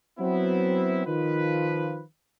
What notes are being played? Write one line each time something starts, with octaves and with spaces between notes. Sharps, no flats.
F#3 B3 C4 E4
D#3 F3 F4 B4